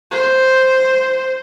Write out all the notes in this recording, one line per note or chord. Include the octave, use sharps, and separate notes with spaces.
C5